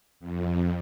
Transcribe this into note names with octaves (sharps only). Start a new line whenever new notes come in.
F2